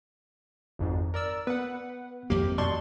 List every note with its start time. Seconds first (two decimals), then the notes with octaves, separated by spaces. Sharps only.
0.79 G#1 F2 G#2
1.14 A#4 D5 E6
1.47 B3 B4 F#5
2.30 G#1 F2 A#3 G4
2.58 F#2 B2 D5 A5 C6 C#6